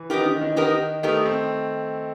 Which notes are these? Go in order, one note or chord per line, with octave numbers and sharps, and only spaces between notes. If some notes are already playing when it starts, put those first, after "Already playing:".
Already playing: E3
D#3 B3 D#4 G4 A#4
D#3
D#3
D#3 B3 D#4 G4 A#4
A3 B3 D#4 G4 A#4
C4